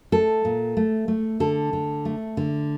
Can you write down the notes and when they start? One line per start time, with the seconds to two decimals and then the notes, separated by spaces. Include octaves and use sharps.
0.12 A3 A4
0.45 A#2
0.77 A3
1.08 A3
1.40 D3 A4
1.73 D3
2.05 A3
2.37 D3